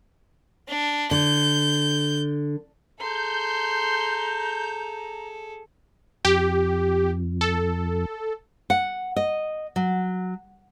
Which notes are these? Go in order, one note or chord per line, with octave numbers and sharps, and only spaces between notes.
D4
D3 G6
G#4 A4 A#5 C6 G6
F2 G4
A4
F#5
D#5
F#3